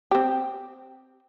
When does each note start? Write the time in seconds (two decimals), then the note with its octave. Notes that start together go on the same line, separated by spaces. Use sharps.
0.11 C4 G4